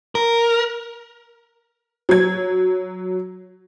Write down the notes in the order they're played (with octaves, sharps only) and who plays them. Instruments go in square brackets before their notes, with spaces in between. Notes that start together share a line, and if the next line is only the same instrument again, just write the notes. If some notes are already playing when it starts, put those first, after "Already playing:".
[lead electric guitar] A#4
[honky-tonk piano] F#3 G#6